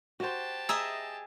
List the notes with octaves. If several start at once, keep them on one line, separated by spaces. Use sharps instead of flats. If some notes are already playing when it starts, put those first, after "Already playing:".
F#4 G4 C5 A5
G#4 D#5 E5 A#5 D#6 E6